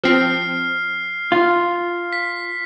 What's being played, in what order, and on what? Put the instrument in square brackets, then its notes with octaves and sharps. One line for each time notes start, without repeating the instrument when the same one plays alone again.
[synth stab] F3 C4 [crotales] F6 C7
[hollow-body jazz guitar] F4
[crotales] B6